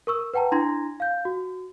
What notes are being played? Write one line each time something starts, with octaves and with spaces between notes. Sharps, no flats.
A#4 C#6 E6
B4 F#5 G5 A5 A#5
D4 E4 A#5 C6 G#6 A#6
F5 G6
F#4